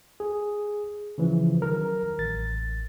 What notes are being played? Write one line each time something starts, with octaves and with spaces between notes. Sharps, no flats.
G#4
C#3 E3 F3
D#3 F#3 A#4
A1 A6